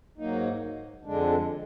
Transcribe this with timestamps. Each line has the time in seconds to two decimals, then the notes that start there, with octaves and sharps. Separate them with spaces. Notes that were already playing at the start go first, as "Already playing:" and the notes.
0.18 G#2 F#3 A#3 D#4
1.05 F2 D3 G#3 D4